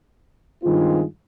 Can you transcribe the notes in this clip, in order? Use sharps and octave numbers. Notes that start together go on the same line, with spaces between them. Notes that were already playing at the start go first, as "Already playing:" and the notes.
G2 D#3 G#3 C4 F4